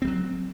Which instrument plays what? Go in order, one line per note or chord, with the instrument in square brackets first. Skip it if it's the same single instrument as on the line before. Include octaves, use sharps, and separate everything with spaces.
[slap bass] C4
G3
F#3